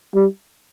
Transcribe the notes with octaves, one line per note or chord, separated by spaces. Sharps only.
G3